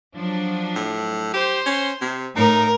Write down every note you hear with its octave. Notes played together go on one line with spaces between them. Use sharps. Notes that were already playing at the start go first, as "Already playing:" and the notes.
F3 F#3 D4
A2
G4 C5 C6
C#4
C3
A2 D#4 A#4